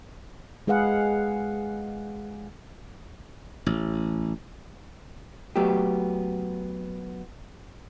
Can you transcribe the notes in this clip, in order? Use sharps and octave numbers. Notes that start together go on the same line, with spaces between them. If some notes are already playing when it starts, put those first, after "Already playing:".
G#3 G#4 B4 F5 F#5
A1
F#3 A3 B3 G4